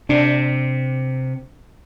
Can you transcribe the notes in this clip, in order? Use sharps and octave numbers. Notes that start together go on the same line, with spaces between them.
C3 D4